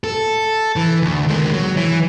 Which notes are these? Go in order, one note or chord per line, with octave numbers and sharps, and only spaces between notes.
A4
E3
D2
D#2 G#3
F#3
E3